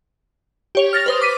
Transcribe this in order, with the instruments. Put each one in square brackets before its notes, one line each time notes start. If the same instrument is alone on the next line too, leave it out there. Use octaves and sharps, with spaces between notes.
[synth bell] G4 C#5 F7
F6 A6 A#6 F7
B4 C5 D#6
D6 B6 D#7